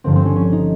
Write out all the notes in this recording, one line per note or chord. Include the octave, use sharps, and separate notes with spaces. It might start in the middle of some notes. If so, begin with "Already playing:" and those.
G1 G2 D3 F3 C4
C4
C#4
C#4
D#4